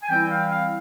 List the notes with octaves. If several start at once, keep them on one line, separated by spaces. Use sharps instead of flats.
G#5
E3 G3 C4 E4 G5
F5
F5